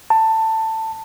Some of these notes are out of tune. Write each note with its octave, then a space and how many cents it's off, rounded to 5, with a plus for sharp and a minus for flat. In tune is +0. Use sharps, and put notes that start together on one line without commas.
A5 +15